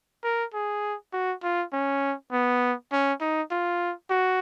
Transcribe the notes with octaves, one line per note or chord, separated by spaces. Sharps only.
A#4
G#4
F#4
F4
C#4
B3
C#4
D#4
F4
F#4